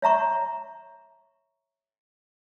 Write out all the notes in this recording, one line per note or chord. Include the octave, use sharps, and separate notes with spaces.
C#5 E5 A#5 C#6